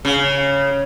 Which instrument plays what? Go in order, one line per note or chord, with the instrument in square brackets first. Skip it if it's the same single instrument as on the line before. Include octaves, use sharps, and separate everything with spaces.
[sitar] C#3